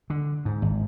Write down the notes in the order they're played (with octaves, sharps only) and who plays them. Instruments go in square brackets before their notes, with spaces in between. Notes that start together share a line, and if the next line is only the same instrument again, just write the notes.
[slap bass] D3
G#2
G#1